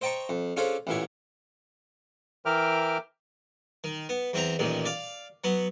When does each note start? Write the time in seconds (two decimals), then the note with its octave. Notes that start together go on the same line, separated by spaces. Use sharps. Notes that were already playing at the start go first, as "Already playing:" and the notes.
0.01 C5 D#5 G5 A5 A#5 C#6
0.29 F2
0.57 C#4 D4 F4 G#4 A4 C5
0.87 A1 E2 A#2 E4 C#5
2.46 E3 A#4 E5 G5 D6 F6
3.84 D#3
4.09 B3
4.33 E2 C4 E4 C5 A#5
4.59 A1 D#2 A#2 D#3
4.85 D5 F5
5.44 F#3 B3